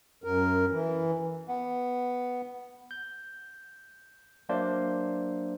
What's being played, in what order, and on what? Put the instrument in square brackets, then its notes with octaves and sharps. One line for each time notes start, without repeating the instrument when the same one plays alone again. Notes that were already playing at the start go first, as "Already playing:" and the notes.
[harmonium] F#2 A#4
E3
[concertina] B3
[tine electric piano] G6
F#3 A#3 D4 C5 D5 E5